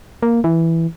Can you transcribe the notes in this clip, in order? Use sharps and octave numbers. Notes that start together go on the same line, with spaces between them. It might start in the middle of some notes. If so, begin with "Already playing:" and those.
A#3
E3